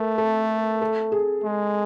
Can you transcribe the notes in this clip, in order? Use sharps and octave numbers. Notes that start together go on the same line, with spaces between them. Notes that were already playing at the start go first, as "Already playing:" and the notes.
Already playing: A3 A#4
A4
A4
G#4
G#3